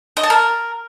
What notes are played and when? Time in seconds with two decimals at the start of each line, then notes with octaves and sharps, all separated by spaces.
0.17 D#5
0.23 A5
0.30 A#4